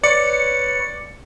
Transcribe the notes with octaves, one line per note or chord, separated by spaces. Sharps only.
B4 C#5 D5 C#7